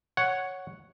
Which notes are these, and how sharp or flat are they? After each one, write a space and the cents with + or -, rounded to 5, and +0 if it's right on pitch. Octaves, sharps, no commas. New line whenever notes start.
C#5 +0 F#5 +0